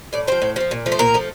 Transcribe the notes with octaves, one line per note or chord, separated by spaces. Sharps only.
A2 D5
F3 C4 C5
A2
F3 C4
A#2
F3 A3
C5
A#2 A#4
F3 A3